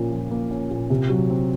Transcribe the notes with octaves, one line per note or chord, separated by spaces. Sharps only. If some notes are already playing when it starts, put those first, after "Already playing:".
Already playing: A#2 F3 A#3 C#4
F3
A#3
C#4
A#2
C3
F#3
C4